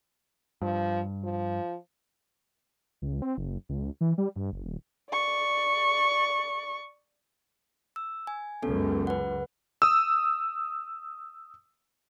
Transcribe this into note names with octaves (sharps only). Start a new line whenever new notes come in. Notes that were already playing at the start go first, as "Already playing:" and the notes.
G2 F3
F3
C#2
C4
F#1
C#2
E3
G3
G2
F#1
D#1
D5 C#6
E6
G#5
C#2 F#2 B3 C#4 A4
B4 F#5
D#6 E6